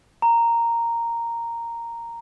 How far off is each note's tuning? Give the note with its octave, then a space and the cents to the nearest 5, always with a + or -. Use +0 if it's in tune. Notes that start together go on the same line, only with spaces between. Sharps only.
A#5 -5